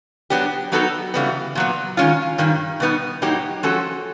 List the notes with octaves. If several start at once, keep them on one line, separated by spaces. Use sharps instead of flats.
F#3 B3 D4 G4
F#3 B3 D#4 F#4 A4
C#3 E3 G3 B3
A#2 F#3 B3
D#3 G#3 C#4 F4
G2 D#3 G3
B2 G3 B3 D#4
A2 F#3 A#3 D#4 G4
F3 G#3 C#4 F#4 A4